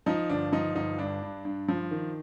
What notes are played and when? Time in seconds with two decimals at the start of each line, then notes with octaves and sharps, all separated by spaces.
0.06 F3 D#4
0.29 G1 D4
0.52 F3 D#4
0.75 G1 D#4
0.98 G2 D4
1.22 G2
1.45 G2
1.68 F3
1.91 D#3